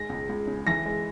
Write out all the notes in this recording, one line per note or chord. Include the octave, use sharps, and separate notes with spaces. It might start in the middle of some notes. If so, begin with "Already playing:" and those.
Already playing: G#3 A#6
C#2
C#2
C#3
E3 A#6
G#3